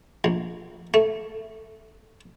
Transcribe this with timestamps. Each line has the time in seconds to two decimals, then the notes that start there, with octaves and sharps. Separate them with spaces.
0.24 A#1
0.94 A3